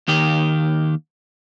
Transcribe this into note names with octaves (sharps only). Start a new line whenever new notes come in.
D#2 D#3 G4